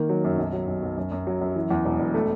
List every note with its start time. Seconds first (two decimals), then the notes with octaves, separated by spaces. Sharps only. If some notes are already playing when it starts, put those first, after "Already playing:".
Already playing: D#3 A#3
0.09 F#3
0.24 F#2
0.38 B1
0.53 F#3
0.67 B1
0.82 B1
0.97 F#2
1.12 F#2
1.27 F#3
1.41 F#2
1.56 E3
1.71 E2
1.85 E1
2.00 E1
2.14 A3